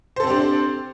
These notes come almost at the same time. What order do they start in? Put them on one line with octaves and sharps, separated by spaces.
C5 A4 C4 G4 D4